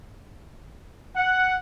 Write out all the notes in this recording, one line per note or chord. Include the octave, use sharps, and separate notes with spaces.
F#5